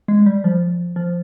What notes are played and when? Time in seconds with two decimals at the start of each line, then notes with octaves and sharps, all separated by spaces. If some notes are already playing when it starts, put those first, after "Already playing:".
0.08 G#3
0.26 G3
0.44 F3
0.96 F3